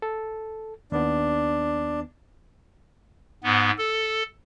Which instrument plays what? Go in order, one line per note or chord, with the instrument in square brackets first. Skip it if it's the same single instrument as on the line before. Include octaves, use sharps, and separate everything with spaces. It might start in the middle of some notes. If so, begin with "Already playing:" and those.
[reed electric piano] A4
[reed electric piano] D#2 B3 [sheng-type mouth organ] D4
[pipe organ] G#2 B3
A4